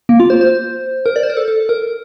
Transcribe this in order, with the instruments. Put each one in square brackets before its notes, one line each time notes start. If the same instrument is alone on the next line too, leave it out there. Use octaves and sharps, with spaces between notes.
[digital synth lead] A#3
F4
C5
C5
A#4
D5
C5
A#4
A4
A4
A#4